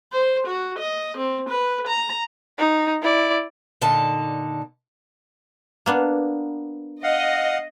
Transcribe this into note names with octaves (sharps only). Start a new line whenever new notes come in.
C5
F#4
D#5
C4
B4
A#5
D#4
E4 D5
A#2 D3 D#4 A4 A5
A#3 B3 D4
D#5 F5 F#5